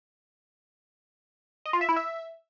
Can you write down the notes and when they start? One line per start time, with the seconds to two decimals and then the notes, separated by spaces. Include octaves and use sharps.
1.66 D#5
1.73 F4
1.81 E5
1.89 E4
1.96 E5